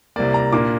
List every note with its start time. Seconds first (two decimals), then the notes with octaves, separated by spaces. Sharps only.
0.16 C2 C3 A#3 D5
0.34 A#5
0.52 A#2 A#3 D4 D6